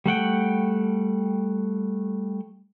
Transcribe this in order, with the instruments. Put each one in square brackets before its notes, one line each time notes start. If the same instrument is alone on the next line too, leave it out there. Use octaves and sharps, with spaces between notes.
[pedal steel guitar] G3 A3 F#5 G5